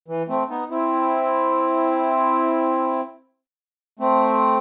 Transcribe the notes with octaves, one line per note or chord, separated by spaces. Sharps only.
E3
A3 C4
B3 D#4
C4 E4
A3 C4